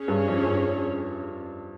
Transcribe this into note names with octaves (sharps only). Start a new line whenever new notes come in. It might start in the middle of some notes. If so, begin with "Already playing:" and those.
Already playing: C#4 G#4 C#5
G2
F2
G2